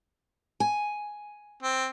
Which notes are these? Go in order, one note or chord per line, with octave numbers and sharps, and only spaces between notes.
G#5
C4